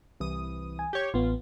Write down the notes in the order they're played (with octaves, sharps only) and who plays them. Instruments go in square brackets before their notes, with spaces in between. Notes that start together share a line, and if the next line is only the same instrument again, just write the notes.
[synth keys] C2 E3 D#6
[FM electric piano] G#5
[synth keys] G4 C#5 [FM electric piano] G6
[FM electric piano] A1 B3 [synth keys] F4